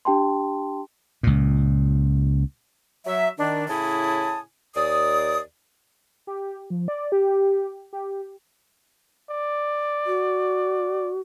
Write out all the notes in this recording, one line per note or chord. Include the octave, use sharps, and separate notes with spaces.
D4 G4 G5 A5 C6
C#2 A#2
F#3 E5
D#3 D4
A2 C#3 E4 G#5 A5 D#6
D#2 D5 D#6
G4
F3
D5
G4
G4
D5
F#4